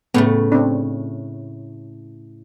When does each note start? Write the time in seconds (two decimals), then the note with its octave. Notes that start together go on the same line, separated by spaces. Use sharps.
0.14 A2 C#3 A3 B3
0.52 C4 D4